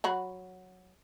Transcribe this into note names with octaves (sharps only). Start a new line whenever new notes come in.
F#3 F#4 B5